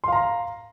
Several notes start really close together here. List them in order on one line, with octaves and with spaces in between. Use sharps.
C6 F5 A#5